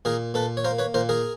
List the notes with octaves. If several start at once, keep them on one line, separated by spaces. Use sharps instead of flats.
A#2 G#4 A#4
A#2 A4 B4
C#5
A#3 A#4 C5
B4 C#5
A#2 A#4 C5
G#4 A#4